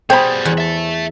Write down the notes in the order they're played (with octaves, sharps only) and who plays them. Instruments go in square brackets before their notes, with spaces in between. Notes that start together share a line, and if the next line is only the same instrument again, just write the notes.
[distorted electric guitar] B2 G3 [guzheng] G#4 [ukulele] C5 B5 [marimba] G5
[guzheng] E2 F#5
[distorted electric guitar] E5 A5